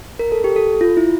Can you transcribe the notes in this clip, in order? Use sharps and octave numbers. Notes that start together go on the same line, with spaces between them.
A#4
A4
G4
A4
F4
E4